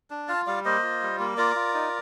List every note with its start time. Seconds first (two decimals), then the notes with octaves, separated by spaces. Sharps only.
0.11 D4
0.28 F4 F5 A5
0.47 G3 D5 F5
0.65 A#3 C5 D#5
0.83 F4
1.02 G3
1.20 A#3
1.37 F4 A#4 D5
1.56 F4
1.74 D#4